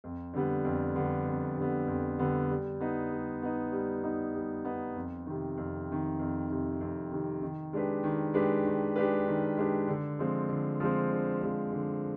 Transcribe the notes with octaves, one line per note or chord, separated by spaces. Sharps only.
F2
D3 G3 B3
F2
D3 G3 B3
F2
D3 G3 B3
F2
D3 G3 B3
G3
B3 D#4
G3
B3 D#4
G3
B3 D#4
G3
B3 D#4
F2
C3 D#3
F2
C3 D#3
F2
C3 D#3
F2
C3 D#3
D#3
G#3 D4 G4 B4
D#3
G#3 D4 G4 B4
D#3
G#3 D4 G4 B4
D#3
G#3 D4 G4 B4
D3
F3 G#3 C4
D3
F3 G#3 C4
D3
F3 G#3 C4
D3